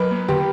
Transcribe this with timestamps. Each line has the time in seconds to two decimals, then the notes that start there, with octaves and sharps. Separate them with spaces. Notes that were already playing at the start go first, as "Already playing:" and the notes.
Already playing: F#3 A#4 B4
0.11 A#3
0.28 D3 G4